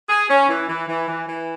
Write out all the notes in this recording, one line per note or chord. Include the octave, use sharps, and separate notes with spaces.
G#4
C#4
E3
E3
E3
E3
E3